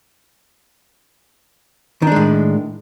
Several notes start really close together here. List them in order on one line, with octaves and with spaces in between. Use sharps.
D#3 D4 G#3 A2